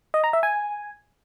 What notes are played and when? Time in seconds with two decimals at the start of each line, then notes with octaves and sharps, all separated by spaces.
0.14 D#5
0.24 A#5
0.33 E5
0.43 G#5